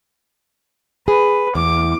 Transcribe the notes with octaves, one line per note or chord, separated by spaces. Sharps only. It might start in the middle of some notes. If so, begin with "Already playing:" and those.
G#4 B4
E2 D6